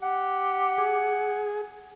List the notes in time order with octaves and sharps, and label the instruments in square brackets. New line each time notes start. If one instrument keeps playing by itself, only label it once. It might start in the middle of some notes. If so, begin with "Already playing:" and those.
[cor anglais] G4 [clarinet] F#5
[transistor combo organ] G#4